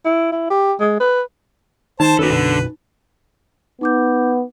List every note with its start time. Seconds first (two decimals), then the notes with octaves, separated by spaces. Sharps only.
0.06 E4
0.32 E4
0.50 G4
0.80 G#3
1.00 B4
2.00 D#3 D#4 C5 A5
2.19 F#1 D#3 C#4 F#4 A4 B4
2.30 B1 F#2 B2 D3
3.81 B3 D#4 D6 G6